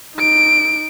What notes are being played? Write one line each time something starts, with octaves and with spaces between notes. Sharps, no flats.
D#4 D7